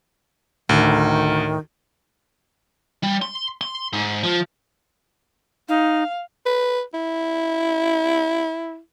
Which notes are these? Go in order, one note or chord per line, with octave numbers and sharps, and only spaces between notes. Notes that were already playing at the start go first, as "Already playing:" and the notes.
D2 A2 D#3
G3
C6
C6
G#2
F3
D#4 F5
B4
E4